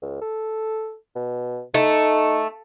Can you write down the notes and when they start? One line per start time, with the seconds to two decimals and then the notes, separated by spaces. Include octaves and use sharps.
0.02 C#2
0.22 A4
1.15 B2
1.74 A3 D#4